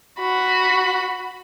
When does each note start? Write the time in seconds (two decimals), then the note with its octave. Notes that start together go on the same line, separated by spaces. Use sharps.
0.20 F#4 B5